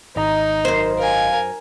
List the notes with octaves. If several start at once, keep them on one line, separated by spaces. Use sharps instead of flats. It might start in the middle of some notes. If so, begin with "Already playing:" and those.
G#1 D#4 D#5 A#5
F#2 A#4 C5
A#4 F5 G#5